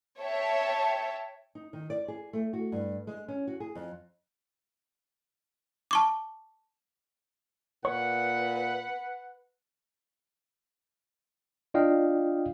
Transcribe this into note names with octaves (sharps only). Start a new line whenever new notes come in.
C#5 E5 G5 A5
D#4
D#3
D5
G#4
A3
F#4
G2
G#3
C#4
F#4
G#4
F2
A5 C#6 D6
A#2 B4 C#5 F#5
D4 F4 D5 D#5 F5 G5